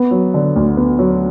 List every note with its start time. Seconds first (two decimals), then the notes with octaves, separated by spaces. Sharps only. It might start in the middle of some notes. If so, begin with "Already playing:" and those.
Already playing: B3
0.11 F#3
0.34 D3
0.56 D2
0.77 B3
0.99 F#3